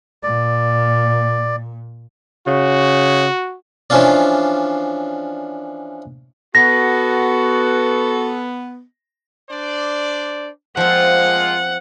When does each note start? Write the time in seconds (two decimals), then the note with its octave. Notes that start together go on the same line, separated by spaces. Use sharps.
0.23 A#2 D5
2.47 C#3 F#4
3.90 E3 F3 C#4 D4 F4 D5
6.55 B3 F#4 A4 A#6
9.50 D4 C5 D5
10.77 F3 G#3 A#3 C4 F4 F#5